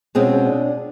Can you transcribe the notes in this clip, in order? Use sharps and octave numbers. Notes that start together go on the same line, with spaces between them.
B2 G#3 C4 C#4 F4 G#4
D4